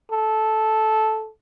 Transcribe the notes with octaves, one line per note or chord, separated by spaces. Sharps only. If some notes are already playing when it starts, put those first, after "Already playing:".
A4